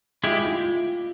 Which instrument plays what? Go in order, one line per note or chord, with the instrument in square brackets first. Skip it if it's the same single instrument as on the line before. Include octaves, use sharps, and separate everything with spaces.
[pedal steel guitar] G#3 E4 G4 [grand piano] F4
[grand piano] F4